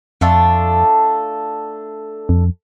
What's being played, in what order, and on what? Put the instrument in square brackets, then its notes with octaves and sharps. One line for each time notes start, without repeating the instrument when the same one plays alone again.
[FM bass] F2 [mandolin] A3 D4 F4 A4
[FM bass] F2